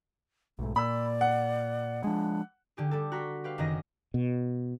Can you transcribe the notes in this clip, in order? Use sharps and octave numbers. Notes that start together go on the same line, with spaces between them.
B1 G#2 A3
A#2 D5 B5 E6
F#5
F3 G#3 D4
D3 G4 G#4
G3 G4 A4
F#4 A#5 C6 B6
G4 B4 F5
F#1 F#2 D#3 D#5 A#6
B2